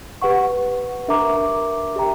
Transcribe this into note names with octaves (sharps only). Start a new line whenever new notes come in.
G4 B4 F#5 C#6
D4 A#4 E5 A#5 D6
G4 A#4 E5 G5 A#5